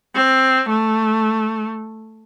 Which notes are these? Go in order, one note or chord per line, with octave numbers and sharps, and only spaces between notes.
C4
A3